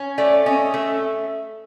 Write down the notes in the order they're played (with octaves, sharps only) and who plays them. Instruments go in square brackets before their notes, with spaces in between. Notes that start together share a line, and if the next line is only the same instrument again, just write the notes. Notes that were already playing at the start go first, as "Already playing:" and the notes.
Already playing: [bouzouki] C#4
[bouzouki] A3 [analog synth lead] D5
[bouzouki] C#4 [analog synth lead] D#5
[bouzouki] A3 [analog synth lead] E5